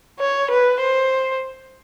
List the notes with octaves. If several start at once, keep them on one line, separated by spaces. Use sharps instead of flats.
C#5
B4
C5